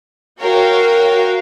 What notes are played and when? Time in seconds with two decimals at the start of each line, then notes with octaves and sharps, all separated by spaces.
0.39 F#4 A#4 C#5 F5 G5